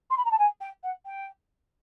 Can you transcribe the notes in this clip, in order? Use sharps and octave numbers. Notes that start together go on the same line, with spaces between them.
C6
B5
A#5
A5
G#5
G5
F#5
G5